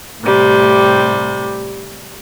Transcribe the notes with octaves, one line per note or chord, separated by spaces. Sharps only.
A2 C3 G3